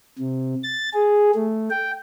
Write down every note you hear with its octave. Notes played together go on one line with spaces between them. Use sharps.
C3
A6
G#4
A3
G5